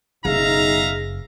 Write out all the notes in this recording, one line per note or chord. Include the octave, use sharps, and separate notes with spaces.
F#1 B1 D#4 G#4 E5 F5 A#5